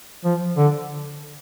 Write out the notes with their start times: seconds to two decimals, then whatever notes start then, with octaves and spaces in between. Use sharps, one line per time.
0.25 F3
0.57 D3